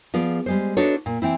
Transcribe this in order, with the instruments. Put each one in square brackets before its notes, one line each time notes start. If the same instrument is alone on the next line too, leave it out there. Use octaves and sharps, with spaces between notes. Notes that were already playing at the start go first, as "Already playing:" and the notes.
[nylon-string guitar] F3 B3 G#4 D5
G3 G#3 C5
D4 D#4 F#4 A4 B4 C#5
A#2
E3 C4 E4